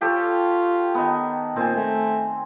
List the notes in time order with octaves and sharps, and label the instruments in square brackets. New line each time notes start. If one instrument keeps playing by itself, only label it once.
[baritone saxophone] F4 [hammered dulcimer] G4 A4 C#5
[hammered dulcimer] D#3 B3
[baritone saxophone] A#2 [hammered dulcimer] C4 G#5
[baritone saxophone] A3